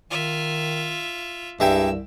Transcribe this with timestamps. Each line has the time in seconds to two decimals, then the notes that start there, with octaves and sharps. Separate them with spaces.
0.10 D#3 F4 E5
1.60 C2 G2 G#3 E5 G5 E6